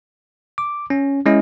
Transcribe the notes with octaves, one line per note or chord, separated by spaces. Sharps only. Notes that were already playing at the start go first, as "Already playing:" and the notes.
D6
C#4
G#3 C#4 E4 D#5